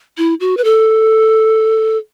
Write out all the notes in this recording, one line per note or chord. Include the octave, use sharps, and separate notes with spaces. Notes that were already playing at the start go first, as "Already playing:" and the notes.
E4
F#4
B4
A4